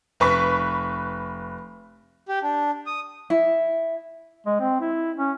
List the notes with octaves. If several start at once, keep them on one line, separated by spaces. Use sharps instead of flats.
F1 B4 C#6 B6
G4
D4
D#6
E4
G#3
C4
E4
C#4